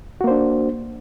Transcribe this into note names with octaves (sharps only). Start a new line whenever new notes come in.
A#3 D4 F#4 C5